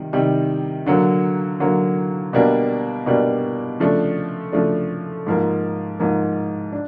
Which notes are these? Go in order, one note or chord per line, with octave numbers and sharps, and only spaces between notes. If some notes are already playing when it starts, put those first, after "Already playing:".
Already playing: C3 D#3 G3
C3 D#3 G3
D3 F#3 A#3
D3 F#3 A#3
B2 G3 A#3 D4
B2 G3 A#3 D4
C#3 F3 A3 D4
C#3 F3 A3 D4
G#2 F3 A#3
G#2 F3 A#3
D4